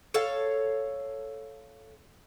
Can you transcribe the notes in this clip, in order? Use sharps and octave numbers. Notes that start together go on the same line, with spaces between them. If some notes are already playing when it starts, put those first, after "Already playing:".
A4 C#5 F5